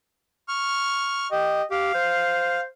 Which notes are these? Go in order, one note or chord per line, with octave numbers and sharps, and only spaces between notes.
C#6 F6
G4 D#5
G4 F5
C5